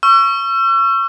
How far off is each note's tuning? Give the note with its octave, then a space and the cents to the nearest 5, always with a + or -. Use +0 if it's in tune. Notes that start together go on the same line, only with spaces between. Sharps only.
C#6 +0 E6 +45